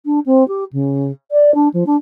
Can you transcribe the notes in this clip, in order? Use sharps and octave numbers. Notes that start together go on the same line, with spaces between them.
D4
C4
G4
C#3
D5
D4
F3
D4